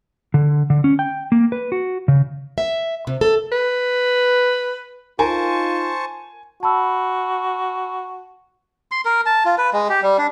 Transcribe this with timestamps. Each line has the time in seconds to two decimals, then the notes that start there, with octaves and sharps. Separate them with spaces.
0.34 D3
0.70 D3
0.84 C#4
0.99 G5
1.32 A#3
1.52 B4
1.72 F#4
2.08 C#3
2.58 E5
3.07 C3
3.21 A4
3.52 B4
5.19 D#4 F4 A#4 C5 G#5 A5 C#6
6.63 F#4 A5 B5 E6
8.91 C6
9.05 A#4
9.26 A5
9.45 F4
9.58 B4
9.73 G#3
9.89 G4
10.03 G3
10.18 D4